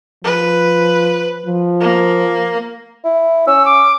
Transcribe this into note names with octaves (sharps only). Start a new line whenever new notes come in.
F3 B4
F3
A#3
E4
C#4 E6
D6